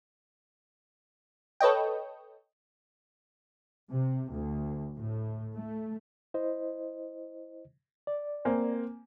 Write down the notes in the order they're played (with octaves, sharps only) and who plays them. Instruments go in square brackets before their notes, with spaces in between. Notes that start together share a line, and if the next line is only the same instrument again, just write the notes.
[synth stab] A4 B4 C#5 D#5 G5
[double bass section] C3
D2
A2
A3
[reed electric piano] E4 C5 D#5
D5
[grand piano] A#3 C4 G#5